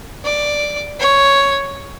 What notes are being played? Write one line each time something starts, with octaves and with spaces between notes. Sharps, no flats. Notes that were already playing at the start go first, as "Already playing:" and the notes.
D5
C#5